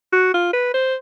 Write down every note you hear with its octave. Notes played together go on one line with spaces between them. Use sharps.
F#4
F4
B4
C5